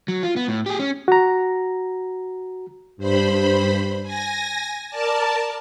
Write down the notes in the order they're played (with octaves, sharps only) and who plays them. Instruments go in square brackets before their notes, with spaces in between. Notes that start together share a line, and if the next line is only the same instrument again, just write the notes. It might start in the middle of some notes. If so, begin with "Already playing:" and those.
[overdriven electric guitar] F#3
F4
B3
A2
G4 G#4
C#4
[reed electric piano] F#4 A#5
[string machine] G2 C5 B5
G#5 A#6
A#4 D5 A5